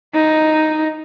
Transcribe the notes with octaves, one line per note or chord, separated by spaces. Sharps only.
D#4